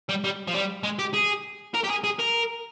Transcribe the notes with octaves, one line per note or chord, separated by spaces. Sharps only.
G3
G3
F3
G3
G#3
G4
G#4
A#4
G4
G#4
G#4
A#4